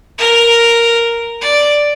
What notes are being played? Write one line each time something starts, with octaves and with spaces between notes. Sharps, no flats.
A#4
D5